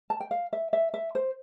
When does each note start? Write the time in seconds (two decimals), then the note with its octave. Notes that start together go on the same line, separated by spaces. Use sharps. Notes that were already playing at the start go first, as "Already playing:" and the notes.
0.10 A5
0.20 G5
0.31 F5
0.53 E5
0.73 E5
0.94 E5
1.15 C5